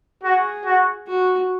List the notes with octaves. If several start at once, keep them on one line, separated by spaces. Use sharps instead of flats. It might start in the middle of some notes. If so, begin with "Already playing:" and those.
F#4 G#4
F#4
F#4